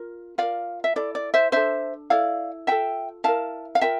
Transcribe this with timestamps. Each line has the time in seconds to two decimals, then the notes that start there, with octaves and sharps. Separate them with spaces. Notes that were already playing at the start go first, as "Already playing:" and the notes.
Already playing: F4 A#4
0.38 F4 A#4 D5 F5
0.84 E5
0.96 E4 A4 D5
1.15 D5
1.34 C5 E5
1.52 D4 A4 C5 E5
2.10 E4 A4 D5 F5
2.67 F4 A4 E5 G5
3.24 E4 A#4 F5 A5
3.75 F5
3.81 F4 A#4 E5 G5